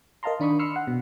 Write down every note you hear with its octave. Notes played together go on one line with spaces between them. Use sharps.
A#4 D#5 F5 A5 A#5 C6
D#3 D4 B5 C#6 D#6
B5 C6 E6 F6 C7 C#7
F#5
B2